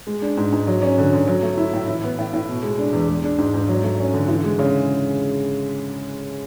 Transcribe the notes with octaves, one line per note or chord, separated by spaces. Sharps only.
G#3
D4
G#2
G#2
F#3
C#4
D3
D3
F#3
A3
E4
A2
E3
B3
A2
A2
B2
G#3
D4
E2
G#3
D4
G#2
G#2
F#3
A3
C#4
D3
E3
G#3
C#3